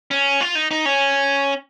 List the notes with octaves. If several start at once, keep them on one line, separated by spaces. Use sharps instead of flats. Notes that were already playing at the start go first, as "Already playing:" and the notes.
C#4
F4
D#4
D#4
C#4